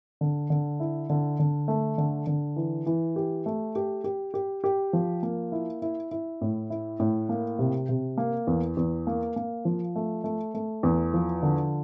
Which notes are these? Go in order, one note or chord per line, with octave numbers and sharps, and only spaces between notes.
D3
D3
E4
D3
D3
A3
D3
D3
E3
E3
G4
A3
G4
G4
G4
G4
F3
A#3
E4
E4
E4
A2
E4
A2
A#3
C3
C3
A#3
E2
E2
A#3
A#3
F3
A3
A3
A3
E2
F3
D3